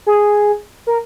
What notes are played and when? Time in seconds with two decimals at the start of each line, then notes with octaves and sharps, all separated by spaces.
0.06 G#4
0.87 A#4